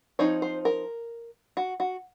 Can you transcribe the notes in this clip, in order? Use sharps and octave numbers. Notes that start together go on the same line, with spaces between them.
F3 C4 D#4 C#5
C5
A#4
F#4
F#4